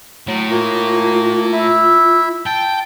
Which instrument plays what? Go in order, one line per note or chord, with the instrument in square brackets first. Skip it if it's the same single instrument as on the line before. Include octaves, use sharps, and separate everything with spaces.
[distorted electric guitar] A2 [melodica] F#3
[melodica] A#3 [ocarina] F4
[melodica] E4 E5
[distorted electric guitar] G5 [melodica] A5